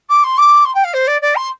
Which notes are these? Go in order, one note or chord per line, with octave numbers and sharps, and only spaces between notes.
D6
C6
D6
C6
G5
F5
C5
D5
D5
C6